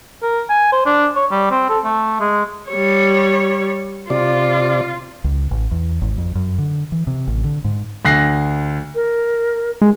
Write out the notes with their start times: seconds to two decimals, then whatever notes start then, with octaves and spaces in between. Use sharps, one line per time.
0.22 A#4
0.50 G#5
0.72 C5
0.86 D4
1.16 C#5
1.31 G3
1.51 C4
1.70 A4
1.84 A3
2.20 G#3
2.69 G3 C#5
4.10 C3 F4 D5
5.24 C#2
5.51 A1
5.71 E2
6.02 G#1
6.18 F2
6.35 F#2
6.58 D3
6.92 E3
7.07 C3
7.27 A1
7.44 D3
7.64 G#2
8.05 D2 F#6 A#6 C7
8.95 A#4
9.82 G#3